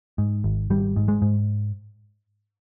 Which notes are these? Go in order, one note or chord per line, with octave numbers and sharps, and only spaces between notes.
G#2
G#1
G#1 G3
G#2
G#3
G#2